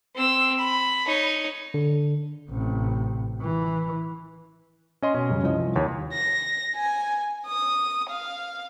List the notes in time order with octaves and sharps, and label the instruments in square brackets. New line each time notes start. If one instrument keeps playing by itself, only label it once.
[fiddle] C4 E6
B5
D#4 C#5
[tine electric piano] D3
[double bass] A1 C3
E3
[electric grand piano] C#4 D#5 C6
[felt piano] B2 [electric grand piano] C#4
[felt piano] F#2 C#3 G3
C2 F3 D#5
[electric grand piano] D#2 [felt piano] C#5
[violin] A#6
G#5
D#6
F5